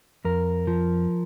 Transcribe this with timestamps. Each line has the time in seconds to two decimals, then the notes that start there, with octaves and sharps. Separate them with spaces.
0.25 F2 A#4
0.67 F3